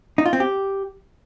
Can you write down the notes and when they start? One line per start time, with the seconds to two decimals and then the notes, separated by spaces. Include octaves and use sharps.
0.18 D#4
0.26 F4
0.33 C4
0.40 G4